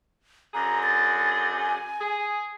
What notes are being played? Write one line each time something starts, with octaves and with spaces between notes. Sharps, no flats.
F#2 D3 G#4 A#5
A6
G#5
G#4